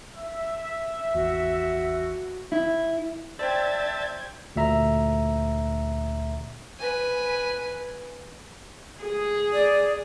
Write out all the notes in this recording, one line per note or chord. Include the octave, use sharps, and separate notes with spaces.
E5
G#1 E2 F#4
E4
C5 D5 E5 G5 A5 G6 G#6
D2 A#2 E5 A#5
B4 G#5
G#4
D5